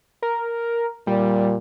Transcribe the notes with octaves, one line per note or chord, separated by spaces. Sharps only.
A#4
A#2 G3